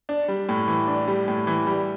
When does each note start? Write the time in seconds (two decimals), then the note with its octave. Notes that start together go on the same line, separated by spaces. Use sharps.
0.09 D4
0.28 G3
0.49 A2
0.68 E3
0.88 D4
1.07 G3
1.28 A2
1.47 E3
1.66 G3